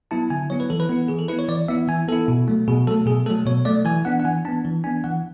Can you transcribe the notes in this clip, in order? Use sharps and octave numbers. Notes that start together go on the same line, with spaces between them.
F#3 B3 E4 A5
D3 G#5
F#3 B3 E4 C#5
B4
E3 A4
B4
B3 E4
E3 G#4
A4
B3 E4 B4
C#5
E3 D5
B3 E4 E5
E3 G#5
B3 E4 A4
B2
F#3 A3
B2 G#4
F#3 A3 A4
B2 G#4
F#3 A3 A4
B2 C#5
F#3 A3 D5
E3 G#5
B3 D4 F#5
F#5
E3 G#5
B3 D4 A5
E3
B3 D4 G#5
E3 F#5